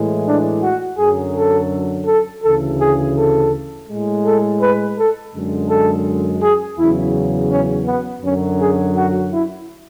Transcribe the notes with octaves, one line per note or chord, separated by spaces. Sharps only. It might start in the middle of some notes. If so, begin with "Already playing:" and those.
Already playing: A2 E3 G#3
D4
F#4
F#2 D3 F#3 G#4
A4
A4
D2 C#3 E3 A4
G#4
A4
A2 G#3
A4
B4
A4
F#2 D3 G#3
A4
G#4
E2 C#3 F#3 E4
C#4
B3
F#2 D3 F#3 C#4
G#4
F#4
E4